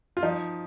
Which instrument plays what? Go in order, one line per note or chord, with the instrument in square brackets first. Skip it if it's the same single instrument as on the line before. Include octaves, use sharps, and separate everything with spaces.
[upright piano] F4
F3 D#4